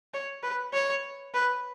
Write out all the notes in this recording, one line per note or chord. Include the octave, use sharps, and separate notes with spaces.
C#5
B4
C#5
B4